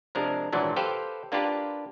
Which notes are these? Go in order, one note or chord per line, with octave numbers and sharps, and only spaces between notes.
C3 F3 G#3 D4 A#4
G#1 A#2 E3 F#3 D4
G4 A4 B4 C5 F5 G5
A#3 D4 F4 G4 B4